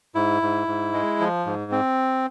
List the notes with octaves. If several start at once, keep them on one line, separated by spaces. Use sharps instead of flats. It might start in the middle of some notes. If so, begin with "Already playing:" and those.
G#2 E4
G#2
G#2
G#3
F3
G#2
C4